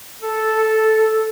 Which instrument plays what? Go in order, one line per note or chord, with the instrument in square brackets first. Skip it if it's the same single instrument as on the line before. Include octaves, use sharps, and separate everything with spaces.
[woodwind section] A4